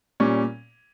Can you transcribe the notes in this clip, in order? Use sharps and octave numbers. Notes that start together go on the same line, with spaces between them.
A#2 G3 C#4